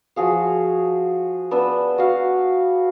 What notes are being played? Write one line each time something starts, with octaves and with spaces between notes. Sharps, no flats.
F3 F#4 G#4 F5
B3 D4 B4 E6
F#4 F5